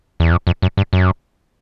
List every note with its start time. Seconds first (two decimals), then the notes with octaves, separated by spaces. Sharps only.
0.20 E2
0.32 F2
0.47 F2
0.62 F#2
0.77 G2
0.93 F#2